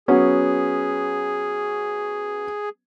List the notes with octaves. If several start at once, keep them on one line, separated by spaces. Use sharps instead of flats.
F#3 B3 C#4 G#4